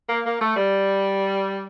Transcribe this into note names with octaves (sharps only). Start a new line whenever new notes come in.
A#3
A#3
A3
G3